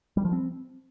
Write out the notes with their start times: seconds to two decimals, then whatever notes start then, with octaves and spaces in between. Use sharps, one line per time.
0.17 G3
0.25 F3
0.33 C4